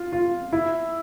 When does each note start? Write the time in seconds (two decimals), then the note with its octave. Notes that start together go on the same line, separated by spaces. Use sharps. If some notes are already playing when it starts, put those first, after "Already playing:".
Already playing: F4
0.12 F4
0.53 E4